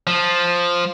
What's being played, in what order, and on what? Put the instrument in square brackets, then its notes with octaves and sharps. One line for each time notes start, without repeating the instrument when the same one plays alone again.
[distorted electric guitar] F3